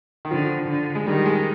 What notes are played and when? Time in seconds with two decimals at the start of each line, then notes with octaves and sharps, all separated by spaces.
0.25 D#3
0.31 D3 F3
0.68 D3
0.95 G#3
1.07 D#3 G3
1.26 G#3